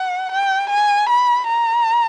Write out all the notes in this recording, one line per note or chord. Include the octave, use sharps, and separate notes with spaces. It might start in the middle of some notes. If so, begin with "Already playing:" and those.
Already playing: F#5
G5
G#5
B5
A#5